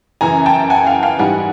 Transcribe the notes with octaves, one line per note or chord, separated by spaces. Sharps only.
F#2 C#3 E3 G#5 A#5
G5 A5
F#5 G#5
F5 G5
F5 G5
G#2 E3 G3 F#5 G#5